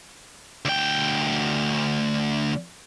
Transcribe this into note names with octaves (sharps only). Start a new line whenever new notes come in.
D2 G5